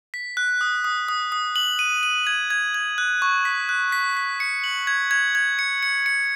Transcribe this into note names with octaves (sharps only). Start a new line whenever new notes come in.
B6
F#6
D#6
D#6
D#6
D#6
F#7
D#7
D#7
G#6
G#6
G#6
F#6
C#6
B6
F#6
B6
B6
C#7
F#7
G#6
G#6
G#6
C#7
C#7
C#7